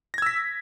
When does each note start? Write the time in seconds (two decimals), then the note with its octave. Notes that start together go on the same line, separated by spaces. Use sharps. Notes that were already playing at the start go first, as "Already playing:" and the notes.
0.14 A#6
0.18 G#6
0.22 E6
0.27 B6